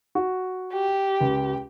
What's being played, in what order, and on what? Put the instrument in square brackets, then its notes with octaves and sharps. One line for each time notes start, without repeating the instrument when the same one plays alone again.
[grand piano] F#4
[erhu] G4
[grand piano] C#2